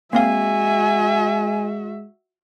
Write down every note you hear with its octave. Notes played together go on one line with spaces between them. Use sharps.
G#3 A#3 C4 F#4 E5 F5 G#5